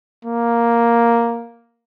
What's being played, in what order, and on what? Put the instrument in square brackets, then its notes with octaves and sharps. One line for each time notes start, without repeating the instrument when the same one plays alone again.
[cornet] A#3